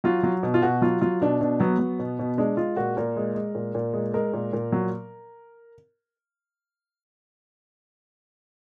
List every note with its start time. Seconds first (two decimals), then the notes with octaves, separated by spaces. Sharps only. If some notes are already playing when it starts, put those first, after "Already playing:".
0.04 F#3 F4
0.23 F#3
0.43 B2
0.54 F4
0.62 B2 F#4
0.82 F#3 F4
1.01 F#3 F4
1.22 B2 D4
1.41 B2 D4
1.60 F#3 B3
1.79 F#3
1.99 B2
2.19 B2
2.38 G#3 D4
2.57 G#3 F4
2.77 A#2 F#4
2.97 A#2 A#4
3.17 G#3
3.35 G#3
3.55 A#2
3.75 A#2
3.93 G#3
4.14 G#3 A#4
4.34 A#2
4.53 A#2
4.72 F#3